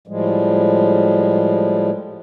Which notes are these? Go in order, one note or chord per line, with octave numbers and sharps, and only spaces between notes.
A2 F3 G3 G#3